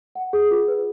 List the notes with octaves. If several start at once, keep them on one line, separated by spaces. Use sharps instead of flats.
F#5
G#4
F4
B4